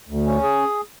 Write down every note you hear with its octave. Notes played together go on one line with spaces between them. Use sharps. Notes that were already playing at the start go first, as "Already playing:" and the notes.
D2
C#4
G#4